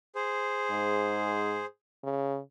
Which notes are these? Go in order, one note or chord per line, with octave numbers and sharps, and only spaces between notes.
G#4 C5
G#2
C#3